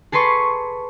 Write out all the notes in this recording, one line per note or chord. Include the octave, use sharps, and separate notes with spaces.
G#4 A4 B4 C6 C#6